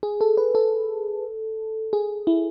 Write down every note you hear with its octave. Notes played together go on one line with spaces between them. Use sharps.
G#4
A4
B4
A4
G#4
E4